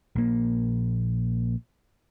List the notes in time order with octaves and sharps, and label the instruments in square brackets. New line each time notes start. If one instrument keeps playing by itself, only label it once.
[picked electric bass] A#1 A#3